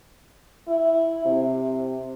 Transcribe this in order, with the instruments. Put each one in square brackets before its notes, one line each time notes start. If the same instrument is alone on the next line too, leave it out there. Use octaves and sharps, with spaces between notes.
[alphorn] E4
C3